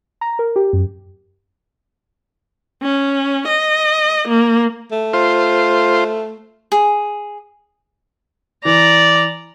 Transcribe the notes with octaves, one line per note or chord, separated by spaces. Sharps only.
A#5
A#4
G4
F#2
C#4
D#5
A#3
A3
F4 C5
G#4
E3 D5 A#5